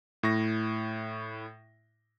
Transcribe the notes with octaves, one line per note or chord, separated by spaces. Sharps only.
A2 E4 C#6 A#6